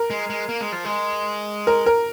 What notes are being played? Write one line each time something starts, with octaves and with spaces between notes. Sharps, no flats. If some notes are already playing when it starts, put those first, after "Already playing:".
Already playing: A#4
G#3
G#3
A#3
G#3
F3
G#3
A#4
A#4